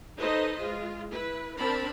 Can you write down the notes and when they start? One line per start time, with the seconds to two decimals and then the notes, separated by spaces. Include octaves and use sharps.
0.18 D#4 A4 B4 C5 D#5
0.58 G#3 F4
1.11 E4 B4
1.59 C4 D4 A#4 A5 B5